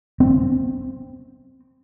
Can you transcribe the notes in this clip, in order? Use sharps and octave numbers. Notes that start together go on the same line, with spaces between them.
C4